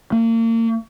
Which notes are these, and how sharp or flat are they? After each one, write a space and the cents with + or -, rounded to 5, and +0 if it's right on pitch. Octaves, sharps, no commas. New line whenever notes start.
A#3 -35